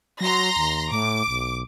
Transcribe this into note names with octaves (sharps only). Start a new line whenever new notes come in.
F#3 A#5 C6 A#6
D#2
A2 D6
B1